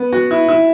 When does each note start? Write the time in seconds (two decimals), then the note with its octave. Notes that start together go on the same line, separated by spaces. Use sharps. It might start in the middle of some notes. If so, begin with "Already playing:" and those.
Already playing: B3
0.13 F#4
0.31 E4
0.49 E4